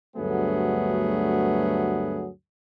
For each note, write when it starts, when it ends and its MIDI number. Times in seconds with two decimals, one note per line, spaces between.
0.16 2.29 38
0.16 2.29 43
0.16 2.29 54
0.16 2.29 57
0.16 2.29 59
0.16 2.29 68